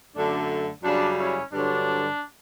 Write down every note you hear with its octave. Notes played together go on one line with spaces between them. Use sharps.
F#2 D3 A3 D4
F#2 C#3 G3 D4
C#4 E4
G2 D3 F#3 D4